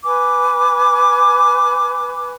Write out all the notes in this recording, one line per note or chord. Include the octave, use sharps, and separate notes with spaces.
B4 G#5 D6